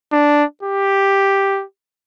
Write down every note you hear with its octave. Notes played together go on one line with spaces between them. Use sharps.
D4
G4